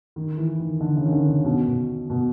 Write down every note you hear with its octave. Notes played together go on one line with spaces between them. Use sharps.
D#3
E3
D#3
D3
C#3
D#3
D3
C#3
B2
B2
B2